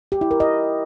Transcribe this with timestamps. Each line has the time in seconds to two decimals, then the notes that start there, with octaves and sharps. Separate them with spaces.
0.12 G4
0.21 E4
0.31 A#4
0.40 D#5